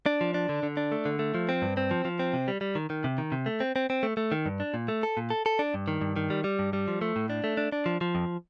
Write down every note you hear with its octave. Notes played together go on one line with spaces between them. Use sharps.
D4
F3
D4
D3
D3
D4
A3
D3
A3
F3
C4
G2
C4
F3
F3
C4
C3
G3
G3
D#3
D#3
C3
D#3
C3
A3
C4
C4
C4
A3
A3
D#3
G2
D4
A#2
A3
A4
A#2
A4
A4
D4
G2
D#3
G2
D#3
G3
G3
G2
G3
F3
A3
A2
D4
A3
D4
D4
F3
F3
F2